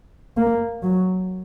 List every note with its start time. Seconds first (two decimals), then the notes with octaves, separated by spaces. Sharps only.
0.37 A#3
0.83 F#3